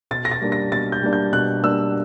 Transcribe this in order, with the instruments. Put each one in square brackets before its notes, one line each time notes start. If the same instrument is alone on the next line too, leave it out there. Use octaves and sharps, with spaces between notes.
[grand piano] B2 A6
A#6
A6
G3 A#3 D4
A#6
B2 A6
G6
G3 A#3 D4
G6
B2 F#6
G3 A#3 D4 E6